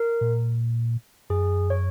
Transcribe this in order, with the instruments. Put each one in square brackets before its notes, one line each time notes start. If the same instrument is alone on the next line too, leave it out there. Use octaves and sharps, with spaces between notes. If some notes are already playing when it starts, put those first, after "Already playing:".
Already playing: [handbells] A#4
[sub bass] A#2
[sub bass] F#2 [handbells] G#4
[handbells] C#5